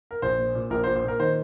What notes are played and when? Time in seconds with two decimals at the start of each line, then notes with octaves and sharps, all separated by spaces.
0.11 A#4
0.22 A#1 C5
0.38 A#2
0.55 A#2
0.70 A#1 A#4
0.84 A#2 C5
0.96 C5
1.04 A#2 A#4
1.20 D#3 C5